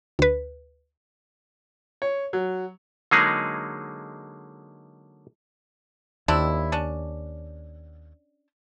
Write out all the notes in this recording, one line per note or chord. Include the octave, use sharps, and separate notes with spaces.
D2 B4
C#5
F#3
D3 F#3 G#3 A#3 D#4 G#4
D#2 C4 D4 E4
C#4 D4